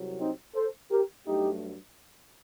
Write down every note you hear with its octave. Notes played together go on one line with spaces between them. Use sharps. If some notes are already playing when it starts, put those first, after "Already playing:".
Already playing: C2 C3 F#3
C4 D#4
A4 C5
G4 A#4
G2 F#3 A3 D#4 G4